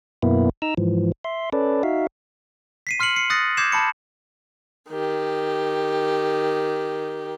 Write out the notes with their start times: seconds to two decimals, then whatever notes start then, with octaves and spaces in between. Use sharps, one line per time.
0.23 F#2 B2 A#3 B3 E4
0.62 D#4 A#5 E6
0.77 G#2 E3 F3
1.24 E5 C6
1.53 C#4 A4 B4 D5
1.83 D#4 F#4 E5 F5
2.87 B6 C7 D#7
3.00 C6 F6 C7 C#7 F#7
3.16 C7 C#7
3.30 D#6 F#6 A6 A#6 C7 C#7
3.57 D6 G6 G#6 C7 E7
3.72 A5 B5 C#7
4.89 D#3 G4